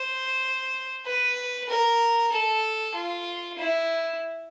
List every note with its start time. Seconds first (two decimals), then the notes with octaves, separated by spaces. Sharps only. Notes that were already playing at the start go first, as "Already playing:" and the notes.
Already playing: C5
1.06 B4
1.69 A#4
2.32 A4
2.95 F4
3.58 E4